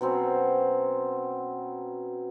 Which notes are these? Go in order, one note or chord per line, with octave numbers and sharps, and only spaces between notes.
B2 F#3 C4 C#4